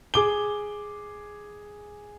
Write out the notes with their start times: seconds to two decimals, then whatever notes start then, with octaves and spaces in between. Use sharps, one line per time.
0.14 G#4 D6 G7